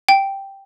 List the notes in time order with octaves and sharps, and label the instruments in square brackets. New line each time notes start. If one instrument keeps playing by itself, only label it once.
[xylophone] G5